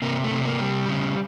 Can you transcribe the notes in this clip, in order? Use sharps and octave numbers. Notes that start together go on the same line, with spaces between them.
C3 A#3
A3
C3
A#3
G3
C#3